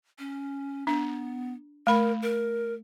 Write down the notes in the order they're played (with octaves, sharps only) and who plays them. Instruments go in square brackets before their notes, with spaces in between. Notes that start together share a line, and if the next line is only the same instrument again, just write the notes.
[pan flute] C#4
[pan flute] B3 [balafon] D4
[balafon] A3 B5 [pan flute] A#4
[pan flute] A#4